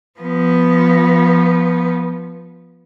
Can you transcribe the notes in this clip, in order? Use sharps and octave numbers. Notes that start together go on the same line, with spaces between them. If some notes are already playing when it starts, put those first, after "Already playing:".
F3 B3